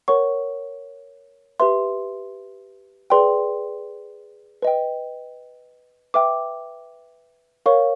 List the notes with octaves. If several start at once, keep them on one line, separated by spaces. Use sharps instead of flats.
A#4 C#5 F#5 C#6
G4 B4 E5 C6
G#4 B4 D5 G5 C6
B4 D#5 G5
B4 E5 G5 D6
A#4 C#5 F5 C#6